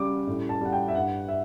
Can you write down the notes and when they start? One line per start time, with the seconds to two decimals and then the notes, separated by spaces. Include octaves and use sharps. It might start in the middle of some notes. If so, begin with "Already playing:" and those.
Already playing: C#3 G3 D6
0.27 A2
0.49 A5
0.61 G3 F#5
0.73 G5
0.88 E5
0.95 G2 F#5
1.28 E5